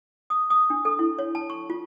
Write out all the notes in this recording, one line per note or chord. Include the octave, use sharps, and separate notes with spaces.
D#6
D#6
D4
A4
E4
C#5
A5
C#6
F4